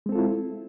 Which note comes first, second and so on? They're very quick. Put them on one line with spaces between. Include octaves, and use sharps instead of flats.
G#3 C4 A4 F4 E4